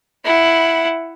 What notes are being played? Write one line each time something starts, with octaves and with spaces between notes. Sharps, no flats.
E4 F#5